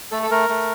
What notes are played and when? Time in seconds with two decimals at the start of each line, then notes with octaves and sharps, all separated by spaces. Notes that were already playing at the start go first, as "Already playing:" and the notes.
0.11 A3 A4
0.23 A4
0.31 A3 A#4
0.49 A3